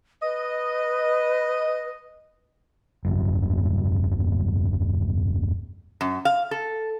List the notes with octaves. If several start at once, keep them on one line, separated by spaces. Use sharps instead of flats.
B4 D#5
D#1 G#1 F#2
F#2
F5
A4